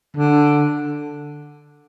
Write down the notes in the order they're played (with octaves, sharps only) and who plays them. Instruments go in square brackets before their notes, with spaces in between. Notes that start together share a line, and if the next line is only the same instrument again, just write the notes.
[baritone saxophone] D3